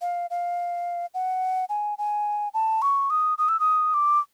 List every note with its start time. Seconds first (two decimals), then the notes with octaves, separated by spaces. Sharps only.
0.01 F5
0.30 F5
1.14 F#5
1.69 G#5
1.98 G#5
2.54 A5
2.82 C#6
3.10 D#6
3.38 D#6
3.48 E6
3.60 D#6
3.94 D6